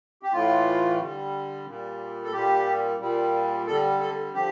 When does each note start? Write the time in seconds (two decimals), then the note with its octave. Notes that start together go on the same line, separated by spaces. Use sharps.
0.23 G4
0.33 A2 E3 A3 F4
0.99 D3 G3
1.66 A#2 G3
2.23 A4
2.32 A#2 G3 G4
3.00 A#2 G3
3.67 D3 G3 A4
4.00 A4
4.34 D3 F3 G4